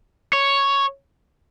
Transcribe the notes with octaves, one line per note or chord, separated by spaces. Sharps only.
C#5